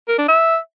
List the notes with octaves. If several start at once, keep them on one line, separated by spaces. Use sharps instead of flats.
A#4
D4
E5